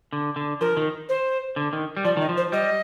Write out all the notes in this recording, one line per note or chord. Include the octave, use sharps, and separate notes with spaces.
D3
D3
F3 A#4
D#3
C5
D3
D#3
G3
F3 D5
D#3 D#5
F3
C5
G3 D#5